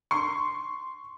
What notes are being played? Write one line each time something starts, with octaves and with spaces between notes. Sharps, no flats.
C6 C#6